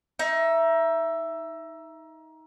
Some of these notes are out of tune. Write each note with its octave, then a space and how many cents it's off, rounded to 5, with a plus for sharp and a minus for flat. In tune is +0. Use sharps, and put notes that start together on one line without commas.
D#4 +20 E5 +10